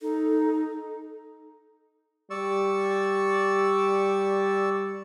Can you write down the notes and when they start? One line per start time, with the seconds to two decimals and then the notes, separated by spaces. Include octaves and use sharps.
0.02 D#4 A4
2.30 G3 D5 C#6 E6